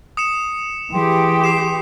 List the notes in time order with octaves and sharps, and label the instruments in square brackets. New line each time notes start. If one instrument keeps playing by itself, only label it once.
[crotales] D#6 C#7 E7
[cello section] E3 G4 [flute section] G#4 G5 C6
[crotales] D#6 C7 E7